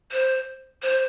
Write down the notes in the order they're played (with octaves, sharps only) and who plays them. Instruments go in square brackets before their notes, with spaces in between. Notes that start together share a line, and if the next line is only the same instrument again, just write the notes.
[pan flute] C5
C5